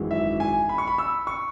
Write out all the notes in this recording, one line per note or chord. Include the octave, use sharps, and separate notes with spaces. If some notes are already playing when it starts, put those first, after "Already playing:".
Already playing: G#1 F#2 E3 G#3
E5
G#5
B5
C#6
B5
E6
C#6